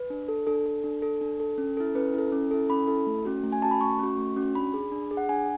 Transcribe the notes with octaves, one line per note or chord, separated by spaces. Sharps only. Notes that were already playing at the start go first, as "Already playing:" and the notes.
Already playing: B4
D4
A4
D4 A4
A4
D4
A4
D4
A4
C#4
E4 A4
C#4 B4
E4 A4
C#4
E4 A4
C#4 B5
E4 A4
A3
C#4 F#4
A3
G#5
C#4 F#4 A5
B5
A3 C#6
C#4 F#4
A3
C#4 F#4
D4 B5
G#4
D4
G#4
F#5
D4 G#5